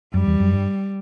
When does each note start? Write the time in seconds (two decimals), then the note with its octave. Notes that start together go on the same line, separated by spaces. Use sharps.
0.14 F#2 G3
0.27 E2
0.40 F#2
0.52 G2